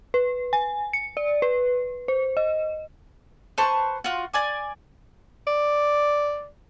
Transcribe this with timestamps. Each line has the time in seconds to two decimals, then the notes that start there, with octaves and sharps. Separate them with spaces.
0.14 B4
0.53 G#5
0.93 C#7
1.17 D5
1.42 B4
2.08 C5
2.37 D#5
3.58 B4 C5 A5 C#6
4.04 F4 F#4
4.34 D5 G#5 D6
5.47 D5